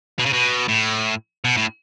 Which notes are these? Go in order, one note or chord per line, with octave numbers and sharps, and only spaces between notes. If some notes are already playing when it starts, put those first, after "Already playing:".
B2
C#3
B2
A2
B2
A2